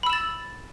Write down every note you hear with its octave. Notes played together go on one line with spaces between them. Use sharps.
B5 E6 A6 E7